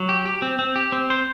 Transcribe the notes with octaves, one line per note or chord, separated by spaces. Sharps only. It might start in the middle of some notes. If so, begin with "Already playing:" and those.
Already playing: F#3
G4
G4
C4
C4
G4
C4
C5